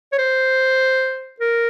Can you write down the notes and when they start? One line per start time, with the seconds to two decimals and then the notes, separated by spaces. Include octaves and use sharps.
0.12 C#5
0.18 C5
1.40 A#4